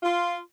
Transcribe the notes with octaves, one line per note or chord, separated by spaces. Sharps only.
F4